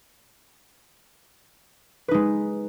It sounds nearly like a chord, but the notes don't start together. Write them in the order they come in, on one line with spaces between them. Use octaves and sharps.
B4 D#4 G#3